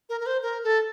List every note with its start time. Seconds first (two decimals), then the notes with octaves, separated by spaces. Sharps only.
0.09 A#4
0.20 A#4
0.26 C5
0.43 A#4
0.64 A4